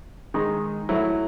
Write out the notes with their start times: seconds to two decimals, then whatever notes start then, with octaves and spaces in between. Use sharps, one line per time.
0.34 D#3 G#3 D#4
0.89 F#3 A3 E4